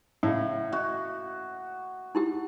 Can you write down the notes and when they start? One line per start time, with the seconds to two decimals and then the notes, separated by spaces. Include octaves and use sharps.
0.23 A2 C#3 F#5
0.72 F#4
2.15 D#4 E4 G4